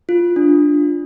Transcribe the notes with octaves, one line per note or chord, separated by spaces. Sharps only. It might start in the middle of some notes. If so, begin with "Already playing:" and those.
F4
D4